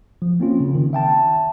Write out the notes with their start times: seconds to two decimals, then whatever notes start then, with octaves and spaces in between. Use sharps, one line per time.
0.22 F3
0.40 A#3 C4 C#4 F4
0.60 C#3
0.75 D#3
0.93 E5 G5 A5